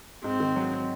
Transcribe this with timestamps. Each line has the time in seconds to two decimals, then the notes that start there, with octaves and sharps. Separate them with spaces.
0.24 G#2 C4
0.40 D#3
0.56 F#3